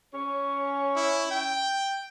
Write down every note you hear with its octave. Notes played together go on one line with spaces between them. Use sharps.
C#4 C#5
E4
G5